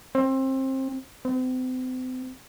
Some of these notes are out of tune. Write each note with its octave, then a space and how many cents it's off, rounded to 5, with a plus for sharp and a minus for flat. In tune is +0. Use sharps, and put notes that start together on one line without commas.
C4 +25
C4 -40